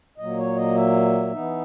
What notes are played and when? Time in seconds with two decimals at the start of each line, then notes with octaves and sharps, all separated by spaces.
0.18 A#2 F#3 A#3 D#5
0.38 C#5
0.56 D#5
0.75 E5
1.32 E3 B3 D#4